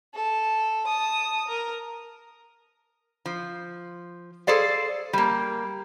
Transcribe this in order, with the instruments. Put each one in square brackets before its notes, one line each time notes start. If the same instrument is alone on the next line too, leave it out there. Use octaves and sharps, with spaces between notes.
[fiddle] A4
A5 D#6
A#4
[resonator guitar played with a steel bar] F3
G#4 A4 C5 D5 F5
G3 A#3